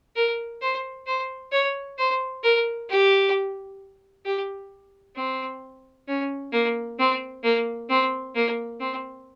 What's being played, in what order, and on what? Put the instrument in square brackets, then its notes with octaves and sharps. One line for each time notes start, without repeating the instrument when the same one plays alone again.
[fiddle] A#4
C5
C5
C#5
C5
A#4
G4
G4
C4
C#4
A#3
C4
A#3
C4
A#3
C4